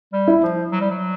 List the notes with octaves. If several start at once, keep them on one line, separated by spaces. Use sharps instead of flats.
G3
E4
F3
F#3
G3
F#3